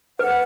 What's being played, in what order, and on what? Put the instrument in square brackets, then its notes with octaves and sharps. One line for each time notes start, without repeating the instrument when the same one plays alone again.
[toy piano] B4 [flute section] F#5